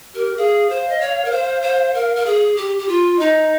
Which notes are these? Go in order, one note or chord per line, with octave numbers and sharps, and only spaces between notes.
G4 A#4
G#4 F5
C5
D#5
C#5
A#4
C5
C5
A#4
A#4
G#4
G4
G4
F4
D#4 D#5